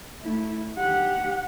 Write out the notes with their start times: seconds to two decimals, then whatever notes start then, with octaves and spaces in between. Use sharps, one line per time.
0.22 A3 E4
0.78 G4 F#5